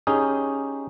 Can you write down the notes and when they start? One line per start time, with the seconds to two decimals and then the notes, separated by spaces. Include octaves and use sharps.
0.07 C#4 D#4 G4 G#4